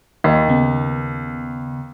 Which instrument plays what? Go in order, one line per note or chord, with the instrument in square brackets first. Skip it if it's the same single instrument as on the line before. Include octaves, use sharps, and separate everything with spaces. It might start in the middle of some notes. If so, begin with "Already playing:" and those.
[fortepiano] D#2 [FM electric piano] D#4
[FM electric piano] C#3 B3